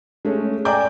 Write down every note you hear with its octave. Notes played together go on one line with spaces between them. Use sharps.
G#3 A3 C#4
D5 G5 G#5 A#5 D6 G6